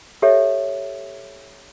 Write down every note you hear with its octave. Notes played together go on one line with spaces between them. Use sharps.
G4 A4 C#5 E5